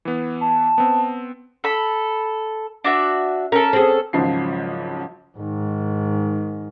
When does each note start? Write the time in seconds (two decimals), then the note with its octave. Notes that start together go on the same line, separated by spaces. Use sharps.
0.05 E3 B3
0.41 A5
0.78 B3 C4
1.64 A4 B5
2.84 D4 F#4 E5
3.52 C#4 A4 A#4
3.73 C4 G#4
4.13 G#1 G#2 C#3 F3 F#3 C7
5.38 G#2 D#3